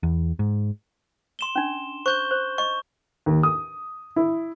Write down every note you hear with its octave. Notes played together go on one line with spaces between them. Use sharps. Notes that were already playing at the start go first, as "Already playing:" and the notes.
E2
G#2
C6 E7 G7
C#4 D4
C5 C#6 G6 G7
C5
D#5 C#6
D#2
D#6
E4